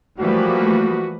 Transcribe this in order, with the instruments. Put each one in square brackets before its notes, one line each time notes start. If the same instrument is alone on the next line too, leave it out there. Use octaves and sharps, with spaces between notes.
[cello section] E3 A3 B4 [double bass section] F3 G3 A#3 [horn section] F#4